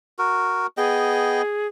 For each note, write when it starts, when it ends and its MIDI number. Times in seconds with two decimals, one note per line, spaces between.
0.19 0.67 66
0.19 0.67 70
0.77 1.42 59
0.77 1.67 68
0.77 1.42 75
0.77 1.42 79